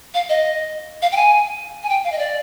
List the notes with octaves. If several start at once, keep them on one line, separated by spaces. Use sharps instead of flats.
F5
D#5
F5
G5
G#5
G#5
G5
F5
D#5
D5